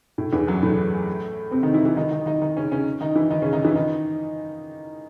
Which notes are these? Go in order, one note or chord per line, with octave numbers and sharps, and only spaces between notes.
A2
E2 E3
F#2 F#3
A2 A3
C3 C4
D#3 D#4
E3 E4
E3 E4
D#3 D#4
D#3 D#4
D#3 D#4
D#3 D#4
C#3 C#4
C#3 C#4
D#3 D#4
E3 E4
D#3 D#4
C#3 C#4
D#3 D#4
E3 E4
D#3 D#4